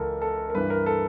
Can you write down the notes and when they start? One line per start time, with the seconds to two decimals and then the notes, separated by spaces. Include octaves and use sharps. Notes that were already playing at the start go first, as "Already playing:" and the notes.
Already playing: C#2 E3 A4 A#4
0.22 A4
0.50 A#4
0.55 G2 E3 B4
0.70 A#4
0.86 A4